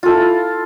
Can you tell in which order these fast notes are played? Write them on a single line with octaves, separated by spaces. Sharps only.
F4 A4 E4